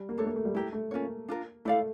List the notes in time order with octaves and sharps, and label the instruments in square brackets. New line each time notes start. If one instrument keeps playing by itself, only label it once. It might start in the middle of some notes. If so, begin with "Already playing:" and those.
Already playing: [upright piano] G3
A#3
[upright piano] A3 [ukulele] D4 A4 C#5
[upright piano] A#3
A3
G3
[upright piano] A3 [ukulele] E4 G4 A#4
[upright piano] A3
[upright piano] A#3 [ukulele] C#4 F4 C#5
[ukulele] D4 F4 A#4
[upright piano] A3 [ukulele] E4 A4 D5 F5